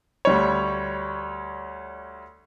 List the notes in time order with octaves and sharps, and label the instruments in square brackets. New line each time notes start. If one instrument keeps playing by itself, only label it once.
[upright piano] D2 G3 C#5